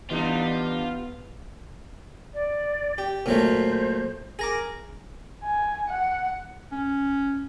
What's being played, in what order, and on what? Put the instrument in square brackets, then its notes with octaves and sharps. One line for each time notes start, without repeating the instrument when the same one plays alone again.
[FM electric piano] E3 [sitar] G3 D4 D#4 [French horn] B3 [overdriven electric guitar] F4
[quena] D5
[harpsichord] G4
[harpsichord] A#2 F#3 A3 [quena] C5
[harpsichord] G#4 A#5 D6 [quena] A#4
[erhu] G#5
F#5
[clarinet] C#4